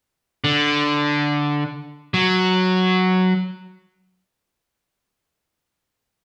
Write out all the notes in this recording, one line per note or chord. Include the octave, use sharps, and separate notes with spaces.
D3
F#3